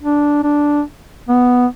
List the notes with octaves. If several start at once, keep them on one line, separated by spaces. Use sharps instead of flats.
D4
D4
B3